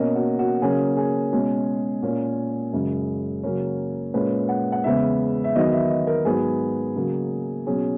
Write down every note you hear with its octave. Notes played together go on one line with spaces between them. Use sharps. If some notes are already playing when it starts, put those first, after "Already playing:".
Already playing: B2 A#3 C#4 D#5
F#4
F#4
C#3 F#3 A#3 C#4 G#4
G#4
B2 G#3 C#4
A#2 A#3 C#4
F#2 C#3 G#3
C#3 F#3 A#3 C#4
A#2 G#3 C#4 B4
F#5
F#5
E2 C#3 G#3 B3 E5
E5
E2 D#3 F#3 B3 D#5
E5
D#5
A#4
G#2 F#3 B3 G#4
C#3 F#3 A#3
B2 F#3 C#4 G#4